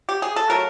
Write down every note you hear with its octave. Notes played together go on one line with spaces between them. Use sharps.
G4
G#4
A4
C#3 F#3 A3 A#4